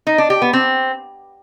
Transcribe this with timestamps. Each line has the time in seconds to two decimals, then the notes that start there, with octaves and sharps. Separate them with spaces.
0.07 D#4
0.18 D4
0.30 G4
0.42 B3
0.53 C4